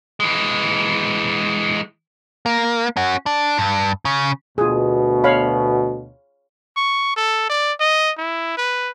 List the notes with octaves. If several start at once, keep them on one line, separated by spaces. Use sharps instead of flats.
E3 G#3
A#3
C#4 F#4
D4
G2
C#3
D2 B2 F4 G#4
C#5 F5 B5
C#6
A4
D5
D#5
E4
B4